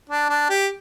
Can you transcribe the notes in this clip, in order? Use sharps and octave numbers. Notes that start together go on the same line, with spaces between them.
D4
D4
G4